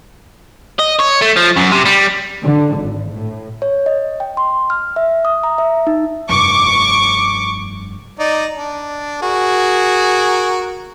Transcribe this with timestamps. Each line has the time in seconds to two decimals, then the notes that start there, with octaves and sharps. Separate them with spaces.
0.79 D#5
1.00 C#5
1.22 A3
1.37 F3
1.57 F#2
1.72 C3
1.85 G3
2.41 D3
2.74 G#1
3.09 A2
3.62 C#5
3.86 D#5
4.20 G5
4.37 C6
4.70 F6
4.96 E5
5.25 D#6
5.43 A#5
5.58 E5
5.87 D#4
6.29 F1 G2 C#6 D6
8.19 D#4 D5
8.57 D4
9.22 F#4 G#4 A#4